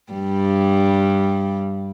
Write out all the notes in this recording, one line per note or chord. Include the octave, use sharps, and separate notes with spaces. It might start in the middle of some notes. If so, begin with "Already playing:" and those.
G2 G3